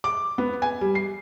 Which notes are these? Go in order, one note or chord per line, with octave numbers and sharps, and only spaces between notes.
D6
B3
G#5
G3
C7